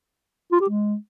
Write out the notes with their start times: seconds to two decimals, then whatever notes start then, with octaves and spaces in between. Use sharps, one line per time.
0.52 F4
0.60 G4
0.69 G#3